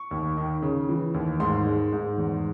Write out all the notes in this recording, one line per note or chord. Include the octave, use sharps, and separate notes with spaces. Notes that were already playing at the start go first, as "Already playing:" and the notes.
Already playing: C#6
D#2
D#3
C#3
E3
D#2
G#2 C6
G#3
G#2
E2